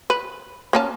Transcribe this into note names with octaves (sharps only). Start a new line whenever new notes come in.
B4
A#3 C#4 A5